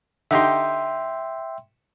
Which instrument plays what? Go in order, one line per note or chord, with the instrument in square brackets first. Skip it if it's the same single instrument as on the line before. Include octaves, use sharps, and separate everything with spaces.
[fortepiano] D3 D#4 G4 [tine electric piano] E5 G5 C6